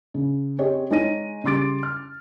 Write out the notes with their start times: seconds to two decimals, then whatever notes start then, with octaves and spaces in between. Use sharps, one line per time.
0.14 C#3
0.58 C4 G4 G#4 C#5 D#5
0.91 G#3 D#4 C#5 A#6 D#7
1.44 C#3 G3 C6 D6 A6 D7
1.83 F6